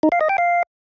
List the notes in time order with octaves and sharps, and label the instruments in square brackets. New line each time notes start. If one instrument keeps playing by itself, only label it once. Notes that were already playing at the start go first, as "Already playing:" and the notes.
[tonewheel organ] D#4
F5
D#5
G5
F5